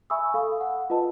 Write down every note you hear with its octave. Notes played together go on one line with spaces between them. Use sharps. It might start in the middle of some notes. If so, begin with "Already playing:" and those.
E5 G#5 B5 C#6 D#6 E6
A4 F5 B5
F#5
F4 B4 D#5 A5